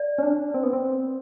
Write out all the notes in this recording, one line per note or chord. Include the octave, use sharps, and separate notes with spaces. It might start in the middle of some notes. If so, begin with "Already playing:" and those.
Already playing: D5
C#4
D4
C4
B3
C4